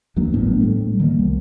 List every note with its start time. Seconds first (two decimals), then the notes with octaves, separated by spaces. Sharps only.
0.16 D#2 F#3 A#3 D4
0.32 G#1 A2 B3 D4
0.61 A2 G3 A3
1.00 D#3 G3 A#3
1.19 C2